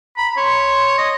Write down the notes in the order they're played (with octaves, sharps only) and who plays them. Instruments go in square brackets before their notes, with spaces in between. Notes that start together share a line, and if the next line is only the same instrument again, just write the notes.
[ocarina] A#5 [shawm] B5
[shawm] C#5 [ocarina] C6
[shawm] D#5